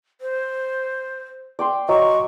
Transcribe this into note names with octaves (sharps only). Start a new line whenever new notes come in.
C5
D5 G5 C6
F#3 D#5 C#6